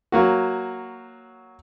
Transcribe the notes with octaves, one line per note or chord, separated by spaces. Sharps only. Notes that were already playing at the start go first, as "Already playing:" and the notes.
F#3 A#3 F#4